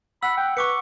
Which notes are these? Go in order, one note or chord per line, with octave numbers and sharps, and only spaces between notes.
F#5 B5 E6
G5
B4 C#6 D6 C#7